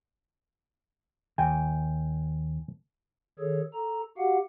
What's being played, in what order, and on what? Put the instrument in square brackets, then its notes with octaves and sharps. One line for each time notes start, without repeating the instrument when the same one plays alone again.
[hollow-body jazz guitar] D#2 [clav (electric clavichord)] G5 G#5
[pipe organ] D#3 G#4 A4 C#5
A4 A#5
F#4 G4 F5 F#5